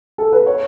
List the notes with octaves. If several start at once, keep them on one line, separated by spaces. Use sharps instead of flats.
A4
B4
C#5